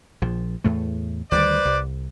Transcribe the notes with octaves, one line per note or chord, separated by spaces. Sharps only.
A#1 F3
E2 A2 A3
D2 D#3 G3 B4 C5 D5
C2